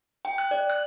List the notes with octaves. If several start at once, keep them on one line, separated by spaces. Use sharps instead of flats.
G5
F#6
D5
F#6